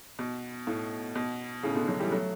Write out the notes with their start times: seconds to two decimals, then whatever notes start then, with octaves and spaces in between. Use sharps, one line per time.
0.19 B2
0.67 A2
1.15 B2
1.63 A2 C#3
1.75 B2 D3
1.88 D3 F#3
2.00 E3 G3
2.12 F#3 A3